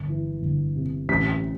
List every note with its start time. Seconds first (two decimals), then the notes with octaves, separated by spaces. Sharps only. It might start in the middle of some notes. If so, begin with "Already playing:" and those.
Already playing: G1
0.08 E3
0.42 G1
0.75 C3
1.08 A1 B6